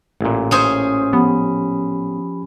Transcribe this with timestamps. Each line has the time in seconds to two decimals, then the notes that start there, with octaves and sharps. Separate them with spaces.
0.21 A1 A#2
0.51 C#4 G#4 C5
1.13 F3 B3 G4 B5